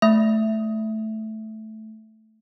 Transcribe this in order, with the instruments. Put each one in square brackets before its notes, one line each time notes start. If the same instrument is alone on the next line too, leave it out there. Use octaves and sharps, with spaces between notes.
[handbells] A3 E5